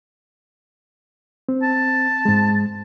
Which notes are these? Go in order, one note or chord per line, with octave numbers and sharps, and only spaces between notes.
C4
A5
G#2 G#3